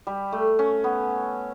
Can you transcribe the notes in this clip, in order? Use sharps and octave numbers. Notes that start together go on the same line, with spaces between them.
G3
A3
C#4
B3